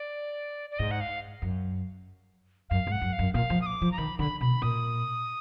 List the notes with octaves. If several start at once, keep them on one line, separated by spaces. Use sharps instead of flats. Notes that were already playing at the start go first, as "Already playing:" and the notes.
Already playing: D5
D5
G#2 D#5
F#5
F5
F#2
F#2 F5
G#2
F#5
F#2
F5
F#2
A#2 F5
F3
D#6
D6
F3
A#5
D#3 B5
D3 B5
B2 B5
A#2 D#6